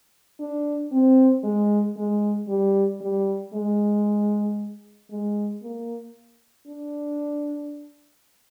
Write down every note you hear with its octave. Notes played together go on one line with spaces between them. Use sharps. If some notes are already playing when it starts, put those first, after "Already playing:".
D4
C4
G#3
G#3
G3
G3
G#3
G#3
A#3
D4